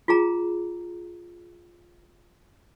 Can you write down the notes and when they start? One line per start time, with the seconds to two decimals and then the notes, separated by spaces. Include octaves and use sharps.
0.08 F4 G#4 A#5